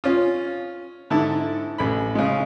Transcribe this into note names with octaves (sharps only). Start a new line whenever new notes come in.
C#4 F4
G#2 D3 E4 A5
A1 B5
C#3 G#3